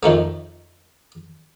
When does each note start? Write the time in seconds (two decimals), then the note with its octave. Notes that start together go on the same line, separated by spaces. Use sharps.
0.03 F2 D#3 A3 A#3